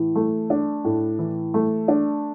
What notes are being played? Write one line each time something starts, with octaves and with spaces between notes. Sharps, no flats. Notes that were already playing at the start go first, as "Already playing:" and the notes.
Already playing: A2 E3
A3
D4
A2
E3
A3
D4